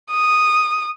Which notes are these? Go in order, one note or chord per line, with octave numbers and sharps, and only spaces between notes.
D#6